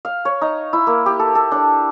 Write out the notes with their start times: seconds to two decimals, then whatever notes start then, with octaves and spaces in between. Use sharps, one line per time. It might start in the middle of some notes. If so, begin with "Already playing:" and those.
0.05 F5
0.25 C#5
0.41 D#4
0.73 E4
0.87 A#3
1.06 G4
1.19 A4
1.35 A4
1.51 D4